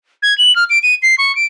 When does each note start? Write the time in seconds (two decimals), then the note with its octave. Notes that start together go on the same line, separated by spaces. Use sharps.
0.22 G#6
0.38 F#7
0.56 F6
0.70 D7
0.83 D#7
1.02 C7
1.18 C#6
1.35 D7